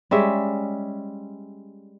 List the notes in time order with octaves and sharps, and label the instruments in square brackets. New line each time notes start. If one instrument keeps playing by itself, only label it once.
[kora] G3 G#3 C#4 E5